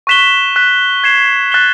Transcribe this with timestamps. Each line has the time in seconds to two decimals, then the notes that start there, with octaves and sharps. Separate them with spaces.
0.07 C#6 F#6 B6 E7 G7
0.56 F#6 B6 E7
1.04 G#6 C7 E7
1.52 F#6 A6 C7 E7 G7